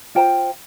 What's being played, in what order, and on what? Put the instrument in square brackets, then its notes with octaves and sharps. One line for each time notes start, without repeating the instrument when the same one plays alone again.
[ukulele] F4 C5 G5 A#5